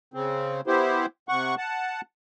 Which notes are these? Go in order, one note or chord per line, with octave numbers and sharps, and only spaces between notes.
C#3 C4
B3 E4 G4 C5
C3 F#5 C#6
F#5 A5